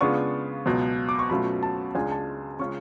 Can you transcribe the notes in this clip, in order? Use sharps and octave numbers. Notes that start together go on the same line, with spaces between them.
C#3 G#3 B3 D4 F4 C#6
C#2 B2 F#3
D6
C#6
B2 F#3 A3 C#4 F4 B5
A5
C#2 C#3 G#3 D4 F4 G#5
A5
C#3 G#3 C#4 F4 C#6